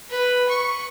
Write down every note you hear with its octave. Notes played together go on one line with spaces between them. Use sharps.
B4
C#6